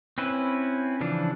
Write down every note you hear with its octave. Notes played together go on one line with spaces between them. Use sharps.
C4 C#4 E4 B4
C#3 E3 F3 D4